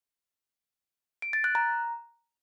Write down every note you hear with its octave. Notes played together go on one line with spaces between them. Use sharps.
D7
A6
F#6
A#5